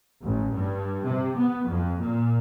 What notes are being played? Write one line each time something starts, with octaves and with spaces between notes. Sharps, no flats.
A1
G2
C3
B3
F2
A#2